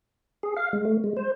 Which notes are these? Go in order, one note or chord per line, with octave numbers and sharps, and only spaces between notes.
G#4
F5
G#3
A3
G#3
C5